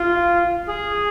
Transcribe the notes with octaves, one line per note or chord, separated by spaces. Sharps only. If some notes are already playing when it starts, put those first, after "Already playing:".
Already playing: F4
G#4